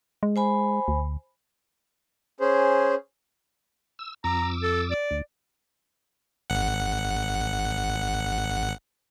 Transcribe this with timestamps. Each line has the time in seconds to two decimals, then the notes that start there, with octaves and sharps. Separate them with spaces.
0.23 G#3
0.36 C5 G#5 B5
0.88 D2
2.40 C#4 G#4 C5
3.99 E6
4.24 F2 A#5 D6 E6
4.63 A4
4.91 D5
5.11 D2
6.50 G#1 F#5